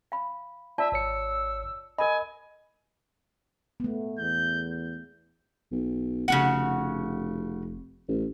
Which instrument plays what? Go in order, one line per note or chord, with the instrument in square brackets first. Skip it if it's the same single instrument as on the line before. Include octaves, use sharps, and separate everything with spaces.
[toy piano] F5 B5
[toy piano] F4 D5 A5 [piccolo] E5
[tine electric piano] G#1 C#5 C#7 [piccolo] E6
[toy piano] A#4 B5 [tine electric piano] D#5 [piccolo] G#5
[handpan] A3 B3
[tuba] E2 [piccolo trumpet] G6
[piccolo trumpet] G6
[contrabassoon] B1
[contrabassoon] F1 [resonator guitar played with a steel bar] C#3 F#4 F#5
[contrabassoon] A1